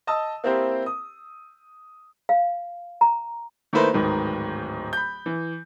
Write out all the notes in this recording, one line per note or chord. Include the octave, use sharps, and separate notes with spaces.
D#5 A5 D#6 E6
A#3 C4 E4 G4 A#4 C5
D#6
F5
A#5
D#3 A3 A#3 E4 B4 C5
D1 G#2 D#3 B4
B5 G6
E3